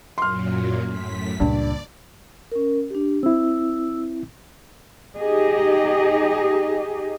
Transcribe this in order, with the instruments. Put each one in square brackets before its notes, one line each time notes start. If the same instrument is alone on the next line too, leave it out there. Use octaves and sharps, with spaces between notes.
[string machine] F#2 A#2 F#3 [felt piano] C6 F6
[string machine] F#2 A2 B6
[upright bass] C#2 A#2 [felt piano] G2 [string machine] D5
[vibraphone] C#4 A#4
D4 G4
[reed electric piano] C4 E4 [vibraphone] E6
[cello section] D#4 G4 G#4 D#5